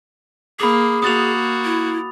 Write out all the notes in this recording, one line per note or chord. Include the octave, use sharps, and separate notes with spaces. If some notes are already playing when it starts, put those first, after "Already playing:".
A#3 G#4 B5 D6
A#3 F#4 D#6 A6 F7
E4